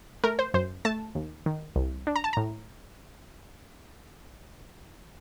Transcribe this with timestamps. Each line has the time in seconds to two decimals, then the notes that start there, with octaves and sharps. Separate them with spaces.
0.24 A3 A#4
0.39 C5
0.54 F#2 C5
0.85 A3 A5
1.15 D#2
1.46 D#3
1.76 C2
2.07 D4
2.16 A#5
2.24 A5
2.33 A2 A#5